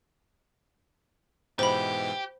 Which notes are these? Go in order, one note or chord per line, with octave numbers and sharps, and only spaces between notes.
G#2 B2 E3 G4 C5 B5